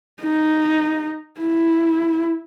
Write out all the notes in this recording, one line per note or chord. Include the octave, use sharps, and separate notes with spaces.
D#4
E4